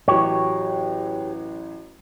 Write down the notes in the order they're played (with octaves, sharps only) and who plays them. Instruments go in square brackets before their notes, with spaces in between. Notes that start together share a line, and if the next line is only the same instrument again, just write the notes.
[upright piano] A1 F#3 [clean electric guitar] G4 C#5